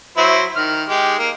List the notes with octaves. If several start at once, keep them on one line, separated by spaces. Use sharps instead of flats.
F#3 E4 C5
D#3 F6
G#3 G4
A#3